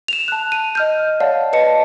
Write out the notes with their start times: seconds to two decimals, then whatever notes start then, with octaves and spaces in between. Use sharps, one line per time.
0.08 E7 F7
0.28 A5 F#6
0.52 D#7
0.75 D#5 F6 G6
1.20 C#5 D5 F5 F#5 A5
1.53 B4 D#5 A5 C#7